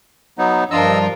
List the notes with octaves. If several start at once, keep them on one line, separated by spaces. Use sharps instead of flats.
F#3 B3 D#4
G2 F3 D4 F4 A#4 D#5 E6